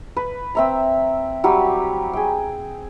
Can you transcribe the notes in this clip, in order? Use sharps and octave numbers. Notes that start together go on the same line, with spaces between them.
B4
C4 E5 A#5
F#3 G3 G4
G#4 G5